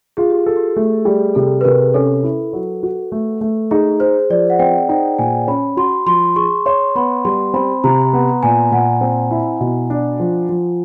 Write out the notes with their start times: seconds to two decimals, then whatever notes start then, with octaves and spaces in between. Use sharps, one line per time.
0.17 F4 G#4
0.30 G4
0.46 A4
0.57 G4
0.76 A3
1.05 G3 G#4
1.35 C3 A4
1.61 B4
1.65 C3 A#4
1.94 C#4 A4
2.23 E4
2.53 F#3
2.83 F#4
3.12 A3
3.41 A3
3.71 D#4 G#4
4.00 G#4 C5
4.30 F3 D5
4.50 F#5
4.59 C4 G5
4.89 D#4 G5
5.18 A#2 G#5
5.48 C#4 B5
5.77 F#4 C6
6.06 F3 C6
6.36 G#4 C#6
6.66 C#5 C6
6.95 B3 B5
7.25 G3 C6
7.54 C4 B5
7.84 C3 A#5
8.13 B3
8.43 A#2 G#5
8.72 A#2 F#5
9.01 C4
9.31 E4
9.60 B2
9.90 D4
10.20 F3
10.49 F3